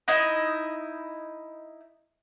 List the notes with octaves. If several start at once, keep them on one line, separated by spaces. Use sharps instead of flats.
D#4 E4 D#5